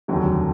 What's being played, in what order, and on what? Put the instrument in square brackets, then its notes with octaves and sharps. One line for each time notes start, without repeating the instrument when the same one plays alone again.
[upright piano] F1 D#2 D3 F#3